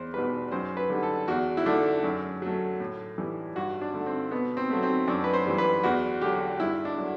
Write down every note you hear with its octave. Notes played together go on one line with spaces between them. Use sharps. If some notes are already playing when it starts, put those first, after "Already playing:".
Already playing: E2 C5
B2 G3 B4
F#2 C5
B4
D3 G3
A4
E2 F#4
E4
D3 A3 D4
F#2
F#3 A3
A2
E3 G3
G2 F#4
D4
D3 A3
C4
B2 B3
C4
F#3 A3
C4
F#2 D4
B4
C5
E3 G3
B4
E2 F#4
D3 F#3 G4
G2 E4
D4
D3 F#3